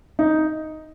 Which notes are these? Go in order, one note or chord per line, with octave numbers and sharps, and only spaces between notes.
D#4